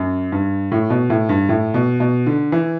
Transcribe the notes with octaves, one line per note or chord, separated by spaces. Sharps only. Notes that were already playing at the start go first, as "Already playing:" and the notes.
Already playing: F#2
G2
A2
B2
A2
G2
A2
B2
B2
D3
E3